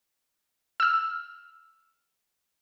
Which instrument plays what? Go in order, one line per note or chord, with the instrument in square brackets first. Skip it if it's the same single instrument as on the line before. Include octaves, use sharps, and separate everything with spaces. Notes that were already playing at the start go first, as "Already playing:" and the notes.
[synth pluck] E6 F6